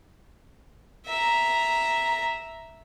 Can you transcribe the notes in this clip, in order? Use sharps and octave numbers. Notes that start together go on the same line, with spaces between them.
E5 A#5